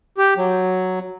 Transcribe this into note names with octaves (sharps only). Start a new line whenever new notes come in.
G4
F#3